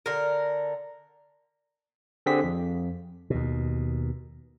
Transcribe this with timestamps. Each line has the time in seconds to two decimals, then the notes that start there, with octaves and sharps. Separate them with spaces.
0.06 D3 A#4
2.26 D3 C4 G4 G#4 B6
2.43 F2
3.30 D#2 B2